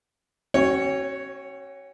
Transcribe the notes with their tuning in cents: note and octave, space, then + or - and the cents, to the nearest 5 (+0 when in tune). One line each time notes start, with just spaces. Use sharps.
C#4 -40 F#4 +30 C#5 +0